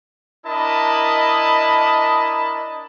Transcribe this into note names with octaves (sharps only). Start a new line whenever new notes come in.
D4 E4 A#4 D#5 A5 B5